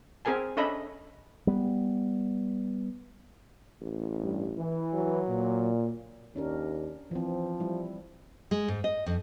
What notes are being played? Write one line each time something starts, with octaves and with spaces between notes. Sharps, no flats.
C4 G#4 A#4 G#5 A5
C#4 D4 A4 D#5 E5 B5
G3 B3
A1
G2
E3
F#3
A#2
D#2 C#4 D4 A#4
E3 F3 C4
G3 E4
G#3
G#2
D#5
F2